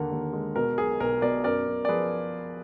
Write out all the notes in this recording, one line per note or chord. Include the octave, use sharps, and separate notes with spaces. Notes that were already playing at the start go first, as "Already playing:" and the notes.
Already playing: D#2 D3 A#4
D#2
G#3
B2 A#4
B1 G#4
B1 A#4
B2 A#4 D5
F#2 A#4 D5
F#2
D5
F3 G#4 B4